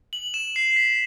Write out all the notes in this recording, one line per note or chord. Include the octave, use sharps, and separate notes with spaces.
F#7
E7
C7
B6